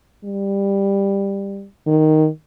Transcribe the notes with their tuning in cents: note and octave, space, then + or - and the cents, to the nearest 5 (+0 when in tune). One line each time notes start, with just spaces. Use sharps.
G3 +15
D#3 +0